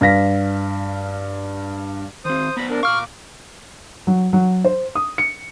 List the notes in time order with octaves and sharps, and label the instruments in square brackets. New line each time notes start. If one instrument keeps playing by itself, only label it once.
[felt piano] G2 F5 A#6 B6
[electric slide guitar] D#3 C4 [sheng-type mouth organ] C5 D#6
[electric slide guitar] B3 C5 D5 [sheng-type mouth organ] A#5 B5
[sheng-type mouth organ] D4 A#4
[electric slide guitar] A#2 F5 [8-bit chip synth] C#6 F6 [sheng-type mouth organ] D6
[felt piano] F#3
F#3
C5
D#6
C#7